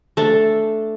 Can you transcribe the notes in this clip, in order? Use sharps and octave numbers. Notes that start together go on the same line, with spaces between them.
A3 D4 A4